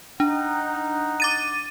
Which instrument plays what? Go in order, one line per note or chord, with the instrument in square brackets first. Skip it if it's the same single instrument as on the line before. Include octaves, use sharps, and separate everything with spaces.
[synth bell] D4 [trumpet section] D#4 F#5
[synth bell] D6 A6 D#7